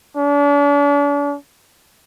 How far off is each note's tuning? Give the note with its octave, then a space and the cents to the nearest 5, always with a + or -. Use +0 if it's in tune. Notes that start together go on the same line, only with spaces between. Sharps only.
D4 -40